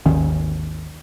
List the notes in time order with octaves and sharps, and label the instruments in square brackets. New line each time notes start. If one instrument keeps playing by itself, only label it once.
[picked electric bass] G#1 D#2 D#3 C#4